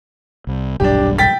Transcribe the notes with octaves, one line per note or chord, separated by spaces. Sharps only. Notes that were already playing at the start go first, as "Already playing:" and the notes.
C2
D#1 B1 G2 D4 G4
G5 A6 B6